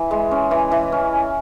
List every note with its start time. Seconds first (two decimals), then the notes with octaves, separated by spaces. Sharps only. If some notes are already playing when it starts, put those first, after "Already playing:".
Already playing: E3
0.11 G#3
0.31 C#4
0.51 E3
0.72 E3
0.92 C#4